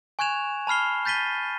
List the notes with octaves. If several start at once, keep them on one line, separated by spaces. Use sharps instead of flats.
G#5 C#6 F#6 G#6 E7 F7
A5 B5 F6 C7 G7
G6 A6 B6 D#7 G7